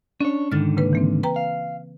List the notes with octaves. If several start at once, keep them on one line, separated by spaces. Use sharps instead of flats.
C#4 D4 C#5
G#2 D3 D#3 F6 A6
C#3 A#3 B4
E3 A#3 C4
B4 G5 A#5
F5